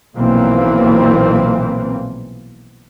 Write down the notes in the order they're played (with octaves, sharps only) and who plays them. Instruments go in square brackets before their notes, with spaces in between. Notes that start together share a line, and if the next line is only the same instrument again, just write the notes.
[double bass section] B1 A#2 E3 F3 A#3 C4